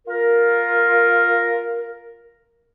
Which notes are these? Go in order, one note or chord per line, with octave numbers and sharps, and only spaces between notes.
F4 A#4